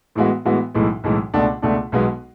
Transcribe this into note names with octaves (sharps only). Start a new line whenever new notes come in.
A2 E3 G#3 B3 F#4
A2 E3 G#3 B3 F#4
B1 A2 E3 G#3
B1 A2 E3 G#3
C#2 B2 A3 D4
C#2 B2 A3 D4
B1 B2 G#3 B3 F#4